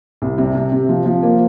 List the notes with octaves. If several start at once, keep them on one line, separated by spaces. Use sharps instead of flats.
C2
C3
C3
C3
F3
F3
A#3